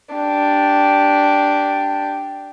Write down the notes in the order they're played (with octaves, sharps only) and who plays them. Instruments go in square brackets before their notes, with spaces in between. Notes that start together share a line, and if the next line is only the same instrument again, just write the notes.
[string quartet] D4 G4